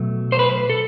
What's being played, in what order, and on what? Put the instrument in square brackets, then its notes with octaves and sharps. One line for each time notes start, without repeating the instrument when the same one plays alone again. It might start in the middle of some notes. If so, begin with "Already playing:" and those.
Already playing: [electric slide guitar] B2 F#3 A3
C5
B4
A4